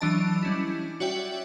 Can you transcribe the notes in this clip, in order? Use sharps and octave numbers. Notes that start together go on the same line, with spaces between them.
E3 F#3 D4 D#5 A5
G3 C#4 E4
F#4 C#5 D5 E5 G5